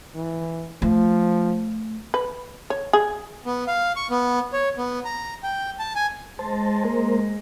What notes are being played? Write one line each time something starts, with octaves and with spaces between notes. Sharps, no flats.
E3
F3 A3
B4
C#5
G#4
B3
F5
C#6
B3
C#5
B3
A#5
G5
A5
G#5
G#3 C5 A5
A#3 A#4 C5